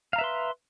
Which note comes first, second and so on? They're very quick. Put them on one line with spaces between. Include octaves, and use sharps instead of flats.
F5 A#5 E5 B4 C6